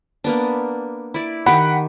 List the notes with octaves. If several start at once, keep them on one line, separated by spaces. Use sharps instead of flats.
A#3 B3 D4
E4 D5
D#3 G4 F#5 B5 D6